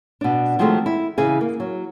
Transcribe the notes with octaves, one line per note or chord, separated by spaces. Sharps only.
B2 D4
D#3 F3 F#3 G#3 A3 C4
E4
C#3 E3 G#4
A#3
F#3